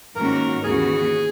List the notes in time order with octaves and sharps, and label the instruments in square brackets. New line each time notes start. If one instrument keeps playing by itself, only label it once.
[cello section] G#2 D#3 A#3 C#4 F#4 [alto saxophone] A#4
[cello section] D#2 C#3 E3 B3 F#4 [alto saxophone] G#4